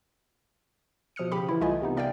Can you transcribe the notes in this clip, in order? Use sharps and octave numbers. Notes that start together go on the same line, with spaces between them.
B2 F3 D#6 F6 C#7
C#3 G4 B5
E3 E4
C2 A3 F4 D#5 G#5
C3 B3 D#4
A#4 D5 E5 F5 G5